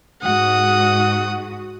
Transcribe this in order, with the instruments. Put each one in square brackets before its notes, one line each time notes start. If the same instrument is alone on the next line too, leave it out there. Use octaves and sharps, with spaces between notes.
[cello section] G#2 F#4 [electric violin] F#5 D#6